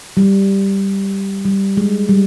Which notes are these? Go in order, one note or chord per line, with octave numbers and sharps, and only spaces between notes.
G3
G3
G#3
G3